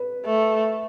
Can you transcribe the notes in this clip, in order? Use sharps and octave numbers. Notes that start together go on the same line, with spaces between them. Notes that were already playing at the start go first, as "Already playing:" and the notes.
Already playing: B4
A3